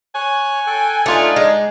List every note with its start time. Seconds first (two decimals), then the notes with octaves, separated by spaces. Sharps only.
0.15 C#5 G#5 F#6
0.67 A4 G5 F#6
1.06 A3 D4 D#4 F4 D5
1.36 G#3